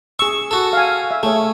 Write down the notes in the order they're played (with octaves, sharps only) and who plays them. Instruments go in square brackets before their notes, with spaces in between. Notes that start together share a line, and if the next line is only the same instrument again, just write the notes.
[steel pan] G#4 E6 [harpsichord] C#6
[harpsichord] F#4 A4
[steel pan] F5 G#5
E5
[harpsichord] A3 [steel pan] G#4 C#5